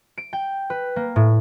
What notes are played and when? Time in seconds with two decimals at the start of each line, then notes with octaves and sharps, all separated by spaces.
0.18 D7
0.33 G5
0.70 B4
0.96 A#3
1.16 A2